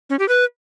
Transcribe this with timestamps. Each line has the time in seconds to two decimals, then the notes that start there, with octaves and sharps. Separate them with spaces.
0.10 C#4
0.19 G4
0.29 B4